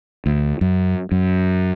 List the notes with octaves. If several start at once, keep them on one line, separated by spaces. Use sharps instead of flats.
D2
F#2
F#2